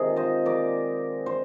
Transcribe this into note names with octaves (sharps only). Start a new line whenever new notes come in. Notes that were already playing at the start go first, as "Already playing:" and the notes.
Already playing: C3 D#3 G#3 C4 F4 G#4 A#4
C5 D#5
A#4 D5
C5